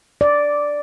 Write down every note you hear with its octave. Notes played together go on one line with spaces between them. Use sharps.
D5